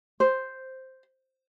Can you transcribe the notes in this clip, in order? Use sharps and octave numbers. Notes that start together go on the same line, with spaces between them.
C5